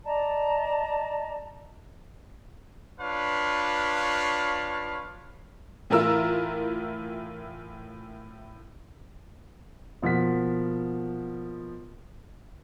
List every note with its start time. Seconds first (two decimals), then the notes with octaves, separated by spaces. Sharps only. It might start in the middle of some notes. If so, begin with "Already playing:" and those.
0.05 D5 D#5 A5 A#5
3.00 D4 F4 B4 C#5 F5
5.90 A2 E3 E4 F4 A#4 E6
10.02 B2 F3 A#3 F#5 B6